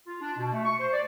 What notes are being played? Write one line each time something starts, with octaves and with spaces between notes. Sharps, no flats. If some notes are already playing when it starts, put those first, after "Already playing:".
F4
D4
B2
A3
C#6
C5
D5